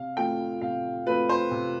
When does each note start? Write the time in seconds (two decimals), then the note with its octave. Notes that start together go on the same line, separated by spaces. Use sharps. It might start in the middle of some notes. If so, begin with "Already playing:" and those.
Already playing: C3 F5
0.17 F3 A3 C4 G5
0.61 C3 F5
1.07 F3 A3 C4 B4
1.29 C5
1.51 C3